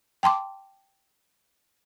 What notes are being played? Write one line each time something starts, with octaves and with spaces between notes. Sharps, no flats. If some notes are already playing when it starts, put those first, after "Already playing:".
G5 A5 C6 D6